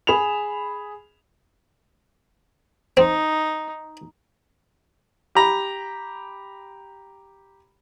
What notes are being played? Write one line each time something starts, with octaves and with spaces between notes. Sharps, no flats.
G#4 B5 E7 F7
C4 D#4
G4 A#5 B5